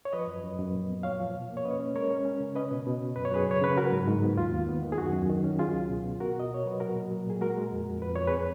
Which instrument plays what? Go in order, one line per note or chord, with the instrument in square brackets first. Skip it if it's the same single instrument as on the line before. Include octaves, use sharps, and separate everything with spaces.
[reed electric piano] C#5
F3 B4 D#5
F#2
F#2
F#2
A#2
B3
F3 C#5 F5
F3
B2
A#3
C#5
C#4 B4 D#5
C#4
G#3 A#4 C#5
C#4
C#4
C#3
C#4 B4 D#5
B2
B2
B2
F#2 B4
C#5
F#2 G#4 B4
C#3 C#5
C#3 B4
F#3 F#4 A#4
G#2
G#2
B3
D#2 F4
D#2
B3
D#3
G#4
F#2 F#4
F#2
D#3
C#4
F#3 F4 G#4
C#2
B2
B2
B3 F#4 A#4
B2
D#5
B2 C#5
F#3 B4
A#2 F#4 A#4
A#2
F#3
A#2 G#4
G#3 F#4 A#4
G#3
F2
F2
F2 B4
F2 C#5
G#4 B4